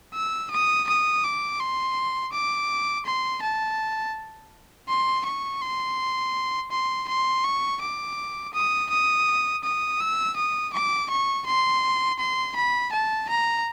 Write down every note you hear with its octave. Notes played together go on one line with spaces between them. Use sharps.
E6
D#6
D#6
D6
C6
D6
C6
A5
C6
C#6
C6
C6
C6
C#6
D6
D#6
D#6
D#6
E6
D#6
D6
C#6
C6
C6
B5
A5
A#5